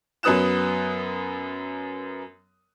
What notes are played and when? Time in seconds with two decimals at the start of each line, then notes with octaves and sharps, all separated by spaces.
0.23 F#2 F#3 B3 D#6 F#6 E7